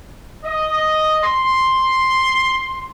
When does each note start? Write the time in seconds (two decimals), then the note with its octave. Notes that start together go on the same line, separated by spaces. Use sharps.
0.44 D#5
1.24 C6